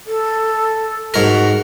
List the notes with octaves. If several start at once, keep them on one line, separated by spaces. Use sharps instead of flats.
A4
G#2 F#4 A#4